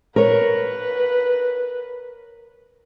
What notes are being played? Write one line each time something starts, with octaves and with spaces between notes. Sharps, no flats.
A#4 B4 C#5